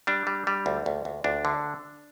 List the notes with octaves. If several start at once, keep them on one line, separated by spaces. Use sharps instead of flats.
G3 D4
G3
G3
D2
D2
D2
D2 D4
D3